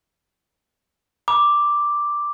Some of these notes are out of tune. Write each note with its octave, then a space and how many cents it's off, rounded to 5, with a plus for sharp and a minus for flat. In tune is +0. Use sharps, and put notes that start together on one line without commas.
B5 -35 D6 +0